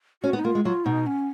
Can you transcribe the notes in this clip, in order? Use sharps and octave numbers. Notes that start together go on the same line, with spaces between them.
C#4 F#4
B3
D#4
A#3 F4
G#3
F#3 F4
B2 D#4
C#4